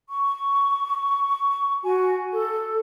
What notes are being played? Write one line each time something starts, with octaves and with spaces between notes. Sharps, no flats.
C#6
F#4 G#5
A4